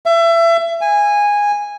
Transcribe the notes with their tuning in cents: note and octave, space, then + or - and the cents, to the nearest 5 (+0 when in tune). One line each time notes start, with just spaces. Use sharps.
E5 +30
G#5 -15